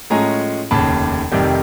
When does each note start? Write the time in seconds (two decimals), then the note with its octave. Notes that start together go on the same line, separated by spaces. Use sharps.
0.10 A2 F3 G#3 C#4 G#5 A#5
0.71 F1 D#2 C#3 A5 B5
1.32 F1 F2 C3 D#3 G3